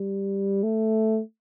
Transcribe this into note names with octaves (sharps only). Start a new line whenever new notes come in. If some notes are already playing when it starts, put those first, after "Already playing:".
Already playing: G3
A3